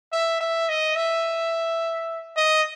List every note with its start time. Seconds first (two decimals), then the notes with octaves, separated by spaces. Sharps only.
0.12 E5
0.41 E5
0.69 D#5
0.96 E5
2.37 D#5